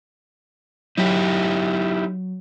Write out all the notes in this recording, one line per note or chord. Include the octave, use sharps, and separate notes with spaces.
F#3 D#4 E4 G4